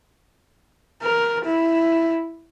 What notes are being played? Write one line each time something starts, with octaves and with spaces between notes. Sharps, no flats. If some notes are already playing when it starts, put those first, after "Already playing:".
A#4
E4